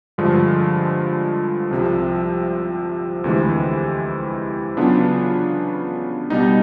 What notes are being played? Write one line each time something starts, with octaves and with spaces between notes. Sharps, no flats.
G2 D3 F3 G#3
C2 C3 F3
D2 C3 E3 G#3
C#3 F#3 B3 D4 F4
B2 G3 B3 D#4